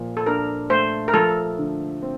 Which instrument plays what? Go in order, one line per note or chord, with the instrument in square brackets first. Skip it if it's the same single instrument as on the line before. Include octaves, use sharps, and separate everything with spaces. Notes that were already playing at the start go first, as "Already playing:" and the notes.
Already playing: [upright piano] A#2 F3
[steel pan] A4
[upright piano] D4 [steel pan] A#4
[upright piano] A3 [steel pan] C5
[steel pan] A#4
[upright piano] F3 [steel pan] A4
[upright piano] D3
C4